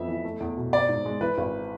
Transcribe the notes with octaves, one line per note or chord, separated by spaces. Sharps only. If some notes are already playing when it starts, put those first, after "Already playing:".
Already playing: F2 B3 E5
E3
A3
E2
B2
C4 D5
G#2
G#3
E3 B4
G#1